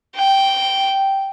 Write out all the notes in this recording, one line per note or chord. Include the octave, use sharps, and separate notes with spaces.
G5